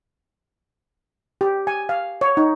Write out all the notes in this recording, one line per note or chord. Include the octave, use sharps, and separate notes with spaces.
G4
G#5
F5
C#5
D#4